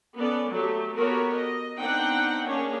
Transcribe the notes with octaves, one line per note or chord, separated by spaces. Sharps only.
B3 C#4 A4 D5
F#3 A3 G4 A4
B3 F#4 G4 A4 A#4 C#5
D#5
B3 C4 D4 D#4 F#5 G5
A#3 C#4 D4 G#4 C#5